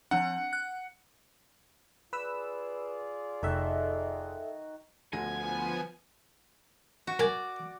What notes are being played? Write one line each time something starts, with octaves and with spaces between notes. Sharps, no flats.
F3 C4 D4 F#5
F#6
F4 G#4 B4 D5 E6
F1 D#3 F#4 A4 E5
D2 D3 F3 B3 G#5 A#6
F#4
A#4 D5 G#5